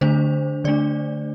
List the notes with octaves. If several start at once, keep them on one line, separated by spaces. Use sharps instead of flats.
D3 A3 D4 C5
D3 A3 D4 D5